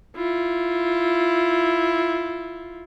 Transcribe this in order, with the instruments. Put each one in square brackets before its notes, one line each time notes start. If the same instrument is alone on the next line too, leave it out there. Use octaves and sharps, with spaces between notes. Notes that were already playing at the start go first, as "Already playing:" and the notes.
[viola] E4 F4